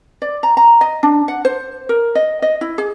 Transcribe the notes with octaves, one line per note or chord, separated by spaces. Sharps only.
D5
A#5
A#5
D#5
D4
F#5
C5
A#4
D#5
D#5
E4
G#4